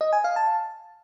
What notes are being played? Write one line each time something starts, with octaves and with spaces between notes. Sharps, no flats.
D#5
G#5
F5
A5